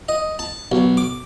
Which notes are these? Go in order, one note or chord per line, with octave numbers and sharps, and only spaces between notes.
D#5
A5
B1
D6